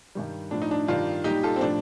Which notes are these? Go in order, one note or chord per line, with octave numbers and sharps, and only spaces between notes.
G2 D#3 G3
A2 F3 D4
D#4
D4
G2 D#3 G3 D4 F4
A#2 G3 D#4 G4
F4 A4
C4
A2 F3 D4